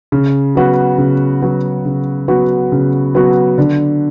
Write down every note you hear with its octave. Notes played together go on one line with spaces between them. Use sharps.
C#3
F#3 B3 F#4
C#3
F#3 B3 F#4
C#3
F#3 B3 F#4
C#3
F#3 B3 F#4
D3